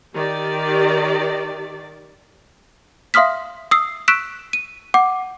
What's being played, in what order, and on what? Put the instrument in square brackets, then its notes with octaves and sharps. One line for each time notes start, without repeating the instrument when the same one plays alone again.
[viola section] D#3 G4 D5
[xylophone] E5 F5 C6 D#6 F6 B6
D#6 E6 C7
C#6 E6 F#6 B6 D7 E7
D#7
F#5 D6